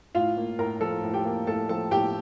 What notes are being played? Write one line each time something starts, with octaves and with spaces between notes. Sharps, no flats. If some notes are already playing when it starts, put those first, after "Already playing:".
A2 F4 F5
A#3
A2 A#4 A#5
F3 A4 A5
A2
G4 G5
A#3
A2 A4 A5
F3 A4 A5
A2 G4 G5